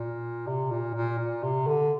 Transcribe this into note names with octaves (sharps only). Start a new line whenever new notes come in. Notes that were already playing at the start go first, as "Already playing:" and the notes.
Already playing: A#2
C3
A#2
A#2
A#2
C3
D3